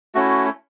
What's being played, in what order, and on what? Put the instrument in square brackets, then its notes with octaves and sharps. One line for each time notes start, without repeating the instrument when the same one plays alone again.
[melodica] A3 C#4 E4 F#4